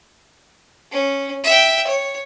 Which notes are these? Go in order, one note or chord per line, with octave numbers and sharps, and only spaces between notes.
C#4
E5 G5
C#5